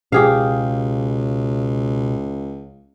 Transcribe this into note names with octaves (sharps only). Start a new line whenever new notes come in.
C#2 B2 G4 G#4 F5